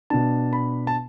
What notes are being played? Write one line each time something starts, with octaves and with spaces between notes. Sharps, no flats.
B2 B3 D4 A5
B5
A5